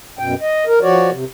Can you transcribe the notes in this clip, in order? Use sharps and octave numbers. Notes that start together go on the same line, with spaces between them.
F#2 B2 G5
D#5
A#4
F3 F#4 C#5 D5
C3